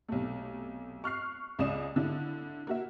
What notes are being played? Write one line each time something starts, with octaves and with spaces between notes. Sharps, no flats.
B1 C3 A3
C#6 F6 F#6 C7
C#2 C#3 G#3 D5 D#6 E7
D3 D4 E4
A#3 F#4 E5